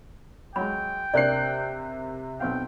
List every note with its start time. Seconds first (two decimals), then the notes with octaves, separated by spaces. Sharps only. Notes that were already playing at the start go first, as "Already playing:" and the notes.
0.56 F#3 G#3 G5 B5
1.14 C3 A#3 D4 D5 F#6 C7
2.40 B1 C4 F5 G5